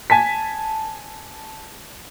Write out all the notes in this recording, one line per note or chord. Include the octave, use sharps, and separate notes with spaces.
G#5 A5 B6